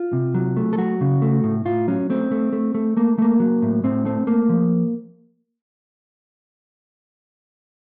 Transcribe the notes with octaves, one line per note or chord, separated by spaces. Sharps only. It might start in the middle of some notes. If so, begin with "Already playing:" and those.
Already playing: F4
C3
F#3
A3
A4
F#3 F#4
C#3
A3
A2
A2 F4
F#3 C#4
A3 C4
A3
A3
A3
A3 A#3
A3 A#3
F#3
A2
A2 C4
A3 C4
A3 A#3
F3